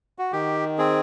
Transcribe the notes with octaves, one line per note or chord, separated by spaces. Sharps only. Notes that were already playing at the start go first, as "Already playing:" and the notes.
F#4
D#3 G4
C4 G#4